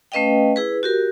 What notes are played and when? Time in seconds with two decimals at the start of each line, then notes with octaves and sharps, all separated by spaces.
0.12 A3 C#4 B4 D#5 F5 G5
0.56 E4 G#4 B4
0.83 F#4 G4 A#4